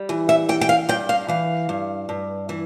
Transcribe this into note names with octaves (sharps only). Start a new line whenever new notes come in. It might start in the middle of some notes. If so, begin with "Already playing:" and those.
Already playing: G3
E3
E5
E3 G5
G5
F5
G2 G5
F5
E3 F5
G2
G2
E3